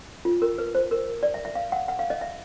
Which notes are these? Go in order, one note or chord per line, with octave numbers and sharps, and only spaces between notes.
F4
A#4
B4
C5
A#4
D5
E5
E5
F5
F#5
F#5
F5
D#5
E5